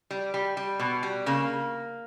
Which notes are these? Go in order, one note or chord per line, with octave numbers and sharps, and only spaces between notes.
G3
G3
G3
B2
G3
C#3 A#3